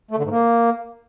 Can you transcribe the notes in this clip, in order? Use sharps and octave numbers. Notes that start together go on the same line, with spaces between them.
A3
D3
G#2
A#3